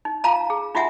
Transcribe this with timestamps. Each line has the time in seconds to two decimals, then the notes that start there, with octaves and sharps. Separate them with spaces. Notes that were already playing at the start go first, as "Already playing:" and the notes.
0.05 D#4
0.24 F4 F5 A5 A#5
0.50 G#4
0.75 D#4 F4 F#4 E5 F#5 G#5